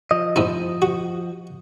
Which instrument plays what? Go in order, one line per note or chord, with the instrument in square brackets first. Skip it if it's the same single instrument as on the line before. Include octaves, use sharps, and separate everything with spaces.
[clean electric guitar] F3 D#5
[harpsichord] G#2 D#4 E4
F#4